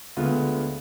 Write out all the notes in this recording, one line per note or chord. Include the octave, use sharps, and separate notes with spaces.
D2 D3 G#3 B3 F4